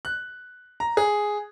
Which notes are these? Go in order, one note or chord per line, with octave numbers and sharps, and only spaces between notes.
F#6
A#5
G#4